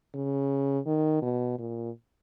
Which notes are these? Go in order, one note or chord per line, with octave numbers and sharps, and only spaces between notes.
C#3
D#3
B2
A#2